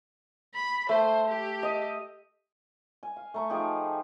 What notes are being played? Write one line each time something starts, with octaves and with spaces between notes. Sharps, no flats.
B5
A3 C5
G4
D#5
G#5
F5
A3 A#5 C#6
F3 D#4 G4 G#4